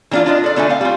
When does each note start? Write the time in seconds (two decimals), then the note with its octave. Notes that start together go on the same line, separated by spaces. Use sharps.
0.11 E3 A#3 D4 D#4 F4
0.26 D4 F4 D#5
0.44 A4 D5
0.56 D3 A3 D4 A4 E5 G#5
0.69 C4 F5
0.81 G3 F4